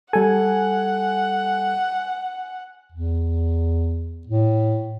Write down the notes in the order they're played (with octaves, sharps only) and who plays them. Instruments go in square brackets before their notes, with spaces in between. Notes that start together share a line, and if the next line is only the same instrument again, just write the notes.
[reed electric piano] G3 A4 [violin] F#5 [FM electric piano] G#5
[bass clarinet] E2
A2